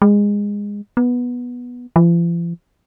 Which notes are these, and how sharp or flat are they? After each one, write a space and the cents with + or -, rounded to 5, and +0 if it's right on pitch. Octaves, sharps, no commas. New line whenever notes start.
G#3 -20
B3 -10
F3 -45